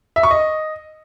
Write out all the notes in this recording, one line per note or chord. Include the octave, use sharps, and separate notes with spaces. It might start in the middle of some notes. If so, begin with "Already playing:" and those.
E5
C#6
D#5